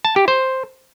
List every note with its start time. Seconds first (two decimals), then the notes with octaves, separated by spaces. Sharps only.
0.05 A5
0.16 G4
0.28 C5